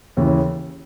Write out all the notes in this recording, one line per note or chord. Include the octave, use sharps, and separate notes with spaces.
D#2 C#3 E3